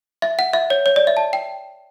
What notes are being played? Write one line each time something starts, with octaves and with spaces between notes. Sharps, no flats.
E5
F#5
E5
C#5
C#5
D5
E5
A5
G5